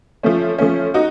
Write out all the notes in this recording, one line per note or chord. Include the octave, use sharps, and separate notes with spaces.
F3 A3 C#4
F3 A3 C#4
D#4 F#4